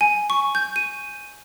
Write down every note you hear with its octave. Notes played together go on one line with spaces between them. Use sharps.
G#5
C#6
G6
D#7